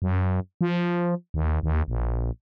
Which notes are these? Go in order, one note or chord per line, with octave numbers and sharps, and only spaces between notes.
F#2
F3
D#2
D#2
A#1